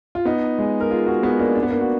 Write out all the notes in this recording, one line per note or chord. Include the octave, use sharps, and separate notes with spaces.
F4
B3 D#4
G#3
A#4
F4 G#4
F#4 A#4
G#3 B3
A#3 D4
D4
B3
A#3 D4
F#4